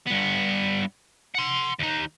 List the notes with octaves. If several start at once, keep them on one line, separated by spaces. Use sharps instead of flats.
G2 B3
F#5 C6
D#2 D#4